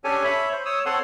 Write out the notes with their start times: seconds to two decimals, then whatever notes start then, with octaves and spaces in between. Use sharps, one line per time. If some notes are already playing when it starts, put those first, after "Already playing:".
0.04 C#4 D4 G4 A4 C#5 G#5
0.24 C#5 E5 B5
0.52 C5
0.65 C#5 D#6 E6
0.86 C4 A4 C#5 F#5 C6